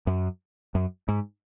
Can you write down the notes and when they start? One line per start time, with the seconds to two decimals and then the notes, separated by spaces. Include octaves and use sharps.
0.07 F#2
0.75 F#2
1.08 G#2